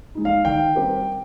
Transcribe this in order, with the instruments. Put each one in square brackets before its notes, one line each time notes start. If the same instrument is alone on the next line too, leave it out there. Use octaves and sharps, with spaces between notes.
[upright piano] G#3 D#4
[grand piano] F5
[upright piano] D#3 [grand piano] G5
[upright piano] G3 C4 G4 A#4